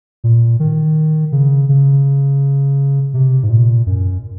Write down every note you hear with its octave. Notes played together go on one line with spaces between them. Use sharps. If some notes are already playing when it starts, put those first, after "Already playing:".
A#2
D#3
C#3
C#3
C3
G#2
A#2
F#2